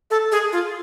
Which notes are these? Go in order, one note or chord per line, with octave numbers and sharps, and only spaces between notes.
A4
G#4
F4